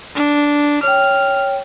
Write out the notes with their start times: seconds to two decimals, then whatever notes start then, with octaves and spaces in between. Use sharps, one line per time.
0.16 D4
0.83 C#5 G5 F6